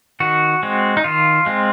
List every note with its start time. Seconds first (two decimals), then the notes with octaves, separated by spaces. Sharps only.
0.20 D#3 F#4
0.63 G#3 C4
0.97 D#4
1.04 D#3 F4
1.46 G#3 C4